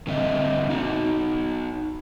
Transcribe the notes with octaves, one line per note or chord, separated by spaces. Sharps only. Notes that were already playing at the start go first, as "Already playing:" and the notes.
D3 G3 C4 D#5 E5
D#4 F#4